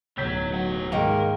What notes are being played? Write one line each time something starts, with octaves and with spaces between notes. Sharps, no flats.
D1 B1 F#3 C#5 G6 B6
G3 F#5
G#2 D#3 A#3 A#4